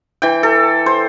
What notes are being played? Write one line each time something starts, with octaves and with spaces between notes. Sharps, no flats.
E3 G5
A4
C5